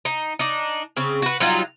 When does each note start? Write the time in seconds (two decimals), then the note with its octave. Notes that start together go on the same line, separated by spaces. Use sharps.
0.05 D#4
0.39 D4 D#4
0.97 C#3 C4
1.22 F#4 B4
1.40 F#3 G3 D#4 F4